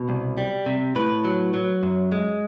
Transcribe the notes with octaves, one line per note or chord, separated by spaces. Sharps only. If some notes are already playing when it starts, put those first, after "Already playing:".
Already playing: B2
C2
G3
C3
A2 B4
F#3
F#3
F#2
G#3